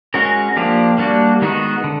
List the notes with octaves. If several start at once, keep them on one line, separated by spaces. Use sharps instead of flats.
G#3 C#4 F#4 A#4
F3 A#3 D4 G4
G3 A#3 D4 F#4
D#3 G#3 B3 D#4 F#4
D3